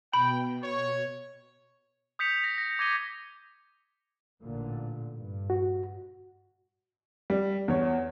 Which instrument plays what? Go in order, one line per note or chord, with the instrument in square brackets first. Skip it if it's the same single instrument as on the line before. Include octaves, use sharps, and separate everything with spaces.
[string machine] B2 [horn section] G5 [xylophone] B5
[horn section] C#5
[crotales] D#6 G6 B6 C#7 F7
A#6
A#6
D6 G#6 A#6 D#7 G7
[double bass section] A1 A#2 D3
G2
[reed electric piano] F#4
[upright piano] G3
E2 C#5